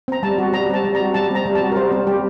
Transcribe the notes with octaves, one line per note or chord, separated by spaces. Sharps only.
C4 A#5
G3 A5
F#4
G3 A#5
C4 A5
G3
A#5
F#4
G3 A5
C4 A#5
G3
A5
F#4
A#4
G3 C5
C4
G3 G4